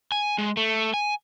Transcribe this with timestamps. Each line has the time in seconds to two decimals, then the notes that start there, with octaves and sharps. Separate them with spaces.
0.12 G#5
0.38 G#3
0.57 A3
0.94 G#5